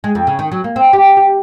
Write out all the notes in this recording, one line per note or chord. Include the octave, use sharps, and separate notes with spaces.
G#3
F2
C#3
D#3
F#3
A#3
C4
G4
G4